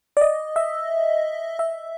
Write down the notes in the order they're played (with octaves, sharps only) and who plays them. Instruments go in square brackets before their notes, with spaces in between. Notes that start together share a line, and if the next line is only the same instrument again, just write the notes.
[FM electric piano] D5
D#5
E5
E5